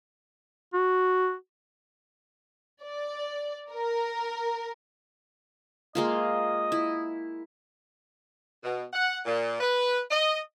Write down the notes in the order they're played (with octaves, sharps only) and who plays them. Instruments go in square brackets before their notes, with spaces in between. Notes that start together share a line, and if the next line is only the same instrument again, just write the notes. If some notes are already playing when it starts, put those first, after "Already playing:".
[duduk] F#4
[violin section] D5
A#4
[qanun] G#3 A#3 F4 [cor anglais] D#5
[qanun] E4
[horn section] B2
F#5
A#2
B4
D#5